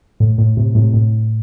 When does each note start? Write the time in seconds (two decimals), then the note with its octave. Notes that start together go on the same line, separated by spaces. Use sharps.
0.20 A2
0.38 A2
0.57 A2 C3
0.75 A2 C3
0.94 A2